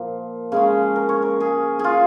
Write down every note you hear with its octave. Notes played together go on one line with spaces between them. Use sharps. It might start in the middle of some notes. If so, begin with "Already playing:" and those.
Already playing: A#2 F3 A#3
C#3 G#3 C#4 G#4
A#4
C#5
A#4
G#4
G#4
F4